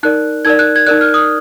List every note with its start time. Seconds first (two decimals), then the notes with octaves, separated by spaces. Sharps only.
0.03 D#4 A#4 D5 F#6
0.45 D#4 A#4 D5 G#6
0.59 F#6
0.76 G#6
0.87 D#4 A#4 D5 F#6
1.01 F6
1.14 D#6